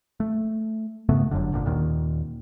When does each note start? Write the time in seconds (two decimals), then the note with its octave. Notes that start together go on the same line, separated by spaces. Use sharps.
0.20 A3
1.09 G#2 C#3 A3 B3
1.31 G1 F#2 D3
1.52 G#1 A#2 D3
1.66 D#2 A#2 D#3